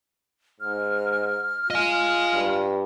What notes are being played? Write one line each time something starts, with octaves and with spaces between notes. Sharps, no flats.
G#2 F6
F4 D#5 G#5
G2